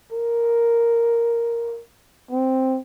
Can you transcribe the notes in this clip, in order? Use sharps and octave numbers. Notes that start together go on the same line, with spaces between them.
A#4
C4